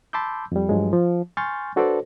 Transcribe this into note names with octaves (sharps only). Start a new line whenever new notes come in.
A5 B5 C6 D6 E6 G6
F2 G3
G2 F3 F#3 G#3
F3
G#5 C6 C#6 F6 G6 A6
D4 F#4 A4 B4 C5 D5